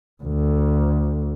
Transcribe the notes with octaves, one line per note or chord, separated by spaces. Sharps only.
D2